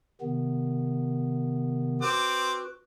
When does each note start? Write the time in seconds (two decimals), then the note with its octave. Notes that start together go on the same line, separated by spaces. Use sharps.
0.21 C3 D#3 B3
2.02 C4 F#4 B4 D6